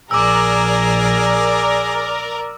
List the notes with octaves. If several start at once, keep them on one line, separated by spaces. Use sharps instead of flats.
A#1 G#4 A#4 D5 D6 E6